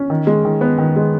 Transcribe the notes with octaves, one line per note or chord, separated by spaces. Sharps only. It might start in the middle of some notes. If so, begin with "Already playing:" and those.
Already playing: C#4
D#3
G#3
D#3
B3
D#3
G#3